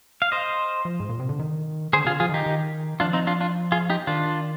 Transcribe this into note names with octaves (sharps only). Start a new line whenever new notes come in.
F5
C5 D#5
F3
G#2
A#2
C3
D3
D#3
D3 G#4 C5
C3 F4 G#4
D3
F3 F4 G#4
D#3 D#4 G4
D#3
F3 D4 F4
C4 D#4
D4 F4
D4 F4
F4 G#4
D#4 G4
D#3 D4 F4